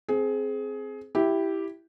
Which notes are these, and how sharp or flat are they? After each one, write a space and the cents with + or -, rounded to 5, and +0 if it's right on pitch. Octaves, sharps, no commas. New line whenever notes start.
C4 +0 G#4 +20
E4 +0 G4 -5